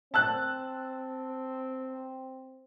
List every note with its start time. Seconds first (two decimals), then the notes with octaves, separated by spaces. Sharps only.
0.14 C4 A5 E6 F#6